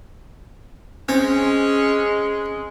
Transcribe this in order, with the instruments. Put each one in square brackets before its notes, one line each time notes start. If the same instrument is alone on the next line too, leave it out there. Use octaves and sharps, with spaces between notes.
[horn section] G#3 [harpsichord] C4 [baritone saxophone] C#4